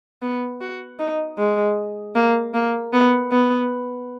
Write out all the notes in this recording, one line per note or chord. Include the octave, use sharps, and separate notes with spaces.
B3
F#4
D#4
G#3
A#3
A#3
B3
B3